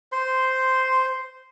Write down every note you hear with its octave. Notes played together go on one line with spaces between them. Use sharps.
C5 C6